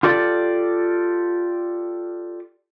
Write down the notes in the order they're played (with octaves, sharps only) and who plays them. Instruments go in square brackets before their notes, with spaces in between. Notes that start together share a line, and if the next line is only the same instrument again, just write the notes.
[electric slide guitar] F4 G4 A4 D5